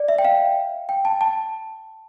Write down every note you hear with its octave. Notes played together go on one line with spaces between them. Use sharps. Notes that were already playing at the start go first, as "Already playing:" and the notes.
Already playing: D5
E5
G5
F5
G5
A5
A5